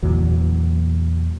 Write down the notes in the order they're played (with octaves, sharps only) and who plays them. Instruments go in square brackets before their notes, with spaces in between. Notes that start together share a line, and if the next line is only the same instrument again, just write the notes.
[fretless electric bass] E2 A#2 E3 F#3